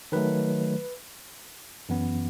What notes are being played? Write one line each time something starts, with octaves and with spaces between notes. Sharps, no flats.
D#3 F#3 A3 B4
F#2 E3 B3